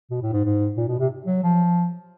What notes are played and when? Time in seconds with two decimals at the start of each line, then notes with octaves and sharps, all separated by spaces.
0.11 B2
0.22 A2
0.33 G#2
0.44 G#2
0.77 A#2
0.88 B2
0.99 C3
1.27 F#3
1.43 F3